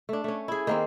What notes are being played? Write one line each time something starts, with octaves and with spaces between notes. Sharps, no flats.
A3 D4
A3 C#4
E4 G#4
D#3 A#3 C4